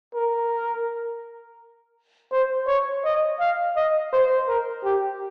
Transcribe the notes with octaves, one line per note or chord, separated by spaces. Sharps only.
A#4
C5
C#5
D#5
F5
D#5
C5
A#4
G4